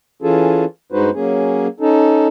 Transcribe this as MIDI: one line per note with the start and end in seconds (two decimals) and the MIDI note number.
0.22 0.65 52
0.22 0.65 61
0.22 0.65 65
0.22 0.65 68
0.22 0.65 69
0.92 1.10 43
0.92 1.10 56
0.92 1.10 63
0.92 1.10 66
0.92 1.10 71
0.92 1.10 72
1.15 1.67 54
1.15 1.67 58
1.15 1.67 61
1.15 1.67 68
1.80 2.28 61
1.80 2.28 63
1.80 2.28 69